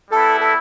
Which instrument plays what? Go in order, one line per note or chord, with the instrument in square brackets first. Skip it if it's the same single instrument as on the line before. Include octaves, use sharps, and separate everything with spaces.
[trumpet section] G3 B3 E4 [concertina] A4
[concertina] A4